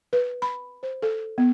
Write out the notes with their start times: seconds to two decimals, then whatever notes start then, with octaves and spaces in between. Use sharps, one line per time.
0.13 B4
0.42 B5
0.83 C5
1.02 A4
1.38 B3